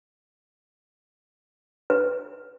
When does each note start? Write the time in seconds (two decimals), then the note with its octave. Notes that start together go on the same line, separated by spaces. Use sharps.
1.90 B4